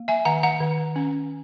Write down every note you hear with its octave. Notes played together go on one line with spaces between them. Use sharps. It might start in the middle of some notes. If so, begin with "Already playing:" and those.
Already playing: A#3
E5 G#5
D#3 F#5 A#5
F#5 A#5
D#3
C#4